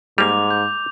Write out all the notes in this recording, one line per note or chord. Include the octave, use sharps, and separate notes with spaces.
G#2 G3 A#3 D6 F7
G6